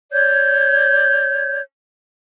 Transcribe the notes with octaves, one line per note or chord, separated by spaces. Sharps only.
C#5 D5 G6 G#6